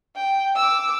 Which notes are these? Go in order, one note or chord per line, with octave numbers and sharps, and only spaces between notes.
G5
D6 E6